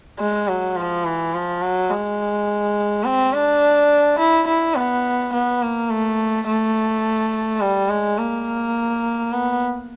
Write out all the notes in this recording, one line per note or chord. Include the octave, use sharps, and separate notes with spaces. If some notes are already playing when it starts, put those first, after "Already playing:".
G#3
F#3
F3
E3
F3
F#3
G#3
C4
D4
E4
E4
B3
B3
A#3
A3
A3
G3
G#3
A#3
B3